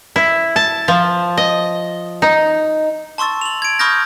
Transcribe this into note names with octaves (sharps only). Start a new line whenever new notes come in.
E4
A5
F3
D#5
D#4
A5 C6 C#6 E6 A6
F7 F#7
G#6 D7
B5 C#6 D#6 F6 G6 A#6